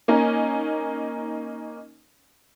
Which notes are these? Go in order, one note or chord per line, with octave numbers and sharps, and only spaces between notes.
A#3 C#4 D#4